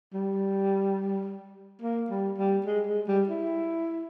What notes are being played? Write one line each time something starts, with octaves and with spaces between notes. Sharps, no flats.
G3
A#3
G3
G3
G#3
G#3
G3
E4